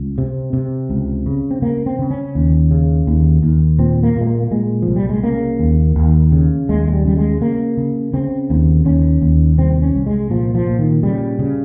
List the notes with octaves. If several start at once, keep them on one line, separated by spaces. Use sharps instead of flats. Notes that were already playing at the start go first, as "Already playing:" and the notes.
Already playing: C#2
C3
C3
C#2
C#3
C4
C#3 A#3
C4
C#3
C#4
D#2
C#3
D#2
D#2
A#2 C4
A#3
A#2 G#3
A#3
A#3
A#2 G#3
F3
C2
G3
G#3
C#3 A#3
D#2
D#2
C#3
D#2 G#3
G#3
G3
C#3 G3
G#3
C#3 A#3
C#3
C#3 C4
D#2
D#2 C#4
D#2
C2 C4
C#4
C2
G#3
A#2 F3
F3
A#2
D#3
C#3 G3
C#3